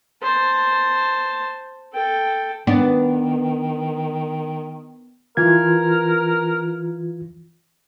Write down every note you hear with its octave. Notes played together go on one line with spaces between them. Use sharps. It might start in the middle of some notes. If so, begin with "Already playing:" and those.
C5 A5
A4 G5
D#3 B3 D4
E3 F4 A#4 G#6